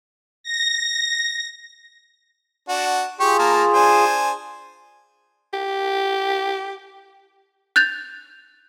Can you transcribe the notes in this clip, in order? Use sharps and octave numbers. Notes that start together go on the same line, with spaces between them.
A#6
D4 F#4
F4 G4 G#4 C#6
A#3 A5 A#5
D4 C5 G#5
G4
F#6 G6 A6 F7